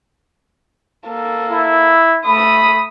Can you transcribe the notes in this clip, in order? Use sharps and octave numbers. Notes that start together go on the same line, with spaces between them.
A#3 A4
E4
A3 B5 D#6